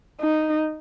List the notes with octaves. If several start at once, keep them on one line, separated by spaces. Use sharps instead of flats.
D#4